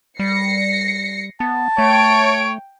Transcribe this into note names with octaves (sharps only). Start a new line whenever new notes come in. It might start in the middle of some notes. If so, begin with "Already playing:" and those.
G3 A#6 C7 C#7
B3 A5
A3 C#5 G5 D7